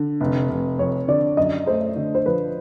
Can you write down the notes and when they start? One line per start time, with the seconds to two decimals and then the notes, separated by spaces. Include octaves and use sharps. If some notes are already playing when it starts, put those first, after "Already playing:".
Already playing: D3
0.20 F1
0.50 F1
0.79 F2 C#5
1.08 D3 D5
1.37 F#2 D#5
1.66 A3 C5
1.96 D3
2.15 C5
2.26 F3 B4